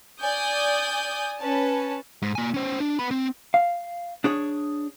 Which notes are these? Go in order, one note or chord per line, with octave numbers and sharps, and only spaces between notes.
D5 G#5 D#6 G6
C#4 B4 A5
G#2
A#3 G#5
C#4 C5
D4
B3 B5
C4
F5
D4 G#4 C#5